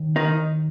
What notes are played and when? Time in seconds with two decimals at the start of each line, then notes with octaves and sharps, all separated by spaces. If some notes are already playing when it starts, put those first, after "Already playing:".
Already playing: D#2
0.16 D#3 D#4